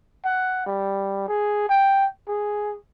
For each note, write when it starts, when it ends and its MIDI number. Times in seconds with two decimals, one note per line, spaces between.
0.25 0.63 78
0.66 1.26 55
1.28 1.66 68
1.69 2.07 79
2.28 2.76 68